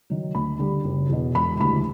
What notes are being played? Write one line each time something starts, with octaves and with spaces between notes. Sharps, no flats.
D#3 F#3
D2 B5
D3 G3
F#1
E2 B2
E1 B5
D2 C#3 E3 G3 B5